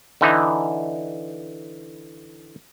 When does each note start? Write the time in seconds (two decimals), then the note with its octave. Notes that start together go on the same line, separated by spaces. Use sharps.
0.21 D3 E3 D#4